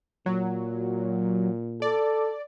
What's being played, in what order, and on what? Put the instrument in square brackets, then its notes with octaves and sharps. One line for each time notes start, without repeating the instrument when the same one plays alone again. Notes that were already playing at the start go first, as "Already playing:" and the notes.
[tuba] A#2 [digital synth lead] F#3
[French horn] A4 [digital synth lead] D5